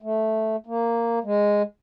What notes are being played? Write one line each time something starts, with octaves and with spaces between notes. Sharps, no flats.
A3
A#3
G#3